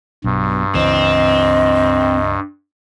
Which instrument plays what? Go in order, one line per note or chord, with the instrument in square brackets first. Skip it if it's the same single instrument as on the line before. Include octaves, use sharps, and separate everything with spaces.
[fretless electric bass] B1 B2 [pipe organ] G2
[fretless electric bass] C#2 E3 [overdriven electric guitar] C4 [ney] D#5